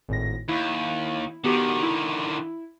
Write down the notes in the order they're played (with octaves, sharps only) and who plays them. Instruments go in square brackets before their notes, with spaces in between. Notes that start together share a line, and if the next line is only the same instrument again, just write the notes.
[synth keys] G#1 A2 A#6
[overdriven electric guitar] D#2 [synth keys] E4
[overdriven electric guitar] D3 D#3 [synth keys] B3 F#4 G4
[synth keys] E4